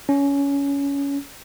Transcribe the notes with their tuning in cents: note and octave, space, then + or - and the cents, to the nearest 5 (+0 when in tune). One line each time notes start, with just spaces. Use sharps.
C#4 +20